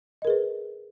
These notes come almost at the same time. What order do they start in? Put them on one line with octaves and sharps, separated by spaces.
D#5 A#4 G#4 B4